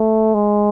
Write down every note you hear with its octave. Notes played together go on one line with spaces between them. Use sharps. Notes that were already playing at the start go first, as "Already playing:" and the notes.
Already playing: A3
G#3